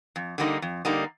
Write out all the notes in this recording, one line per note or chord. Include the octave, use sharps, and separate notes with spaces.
F2
D3 G3 A#3 D#4
F2
D3 G3 A#3 D#4